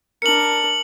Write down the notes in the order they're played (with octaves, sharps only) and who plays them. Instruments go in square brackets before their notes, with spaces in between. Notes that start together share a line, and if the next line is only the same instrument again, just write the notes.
[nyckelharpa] D4 A#4 [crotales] C#7 F#7